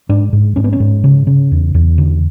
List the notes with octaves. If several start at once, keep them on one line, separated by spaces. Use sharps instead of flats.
G#2 D4
G#2
G#2 C#4
B3
C#4
G#2
C#3
C#3
E2
E2
D3